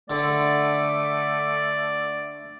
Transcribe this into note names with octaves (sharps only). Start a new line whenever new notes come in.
D3 A3 D5